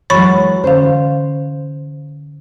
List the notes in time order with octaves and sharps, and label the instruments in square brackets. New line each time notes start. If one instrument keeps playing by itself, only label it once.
[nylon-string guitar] E3 F#3 G#3 [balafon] C#5 B5 C#6
[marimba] D3 C#4 F5 [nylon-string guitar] C5